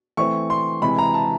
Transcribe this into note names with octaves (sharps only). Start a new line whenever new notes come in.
E3 A3 C4 C#6
C6
C3 E3 G#3 B5
A#5
A5